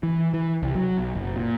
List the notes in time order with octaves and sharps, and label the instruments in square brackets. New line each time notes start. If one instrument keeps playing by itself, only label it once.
[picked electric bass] E3
E3
C2
F#3
B1
F#1
A#2